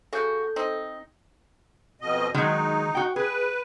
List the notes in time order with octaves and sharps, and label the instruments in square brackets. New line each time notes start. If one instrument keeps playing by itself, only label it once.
[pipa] C#3 F#4 [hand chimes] A4 G6
[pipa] C4 D#4
[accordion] F2 B2 D#5
[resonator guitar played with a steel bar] D#3 F#3 G#3 [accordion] D#4
[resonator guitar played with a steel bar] F#4 G5
[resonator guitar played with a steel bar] G#4 [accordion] B4